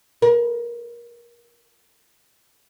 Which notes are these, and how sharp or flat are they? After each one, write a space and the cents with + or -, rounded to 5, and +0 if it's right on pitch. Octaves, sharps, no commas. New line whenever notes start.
A#4 +25